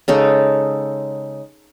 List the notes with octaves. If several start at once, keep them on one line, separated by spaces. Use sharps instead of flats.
C#3 G#3 D#4 A4